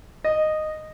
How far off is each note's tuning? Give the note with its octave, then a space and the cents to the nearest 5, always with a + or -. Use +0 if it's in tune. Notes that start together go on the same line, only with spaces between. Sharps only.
D#5 -10